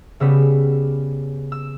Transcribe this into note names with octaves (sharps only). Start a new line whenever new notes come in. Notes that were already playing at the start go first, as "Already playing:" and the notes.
C#3 G3 B3 E6
E6